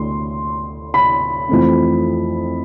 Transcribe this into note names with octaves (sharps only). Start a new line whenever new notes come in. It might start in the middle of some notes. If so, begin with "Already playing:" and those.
Already playing: D2 D3 A3 C6
B5
F2 E3 A3 C4